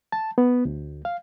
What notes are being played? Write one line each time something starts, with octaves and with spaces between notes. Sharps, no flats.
A5
B3
D2
F5